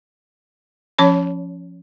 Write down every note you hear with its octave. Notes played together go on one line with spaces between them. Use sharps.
F3 C#4 C#5 B5